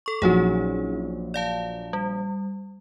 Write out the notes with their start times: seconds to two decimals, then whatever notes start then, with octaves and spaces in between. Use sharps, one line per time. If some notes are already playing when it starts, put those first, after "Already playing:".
0.06 A4 C#6
0.22 A#1 F#3 C#4 D#4 F#4 G#4
1.34 D5 F5 A5
1.93 G3